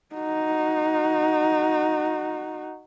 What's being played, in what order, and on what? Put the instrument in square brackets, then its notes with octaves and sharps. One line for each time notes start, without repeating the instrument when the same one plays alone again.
[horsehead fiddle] D#4 F#4